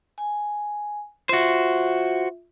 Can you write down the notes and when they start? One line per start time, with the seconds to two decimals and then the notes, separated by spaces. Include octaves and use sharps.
0.18 G#5
1.29 F4 F#4 C5 E5